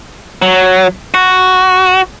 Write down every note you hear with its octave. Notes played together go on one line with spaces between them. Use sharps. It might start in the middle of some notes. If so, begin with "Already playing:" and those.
F#3
F#4